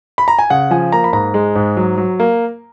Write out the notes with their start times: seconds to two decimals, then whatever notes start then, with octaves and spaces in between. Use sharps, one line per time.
0.18 B5
0.28 A#5
0.39 G#5
0.50 C#3 F#5
0.71 F3 G#5
0.92 A#3 A#5
1.04 B5
1.13 G#2 A#5
1.34 G#3
1.55 G#2
1.77 F#3
1.98 F#3
2.20 A#3